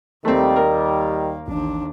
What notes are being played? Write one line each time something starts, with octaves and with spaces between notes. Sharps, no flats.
D#2 D#3 G3 A3 A#3 C4
A#4
A1 D#2 D4